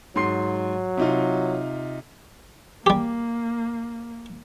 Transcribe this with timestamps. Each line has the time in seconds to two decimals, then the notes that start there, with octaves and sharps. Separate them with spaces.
0.16 G#2 F#3 C6 C7
0.97 C3 D#4 F4
2.86 G3 A#3 G4